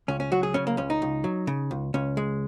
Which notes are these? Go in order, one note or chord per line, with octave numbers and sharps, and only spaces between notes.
C#2 C#4
C#4
F#3 F#4
G#4
C#3 C#4
A#3
C#2 C#4
D#4
C#2
F#3
C#3
C#2
C#2 C#4
G#3